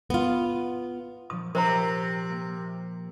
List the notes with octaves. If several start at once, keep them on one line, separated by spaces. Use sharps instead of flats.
B3 F4
A#2 F3 D#6
C3 F3 A#4 C5 A#5
A#3 D7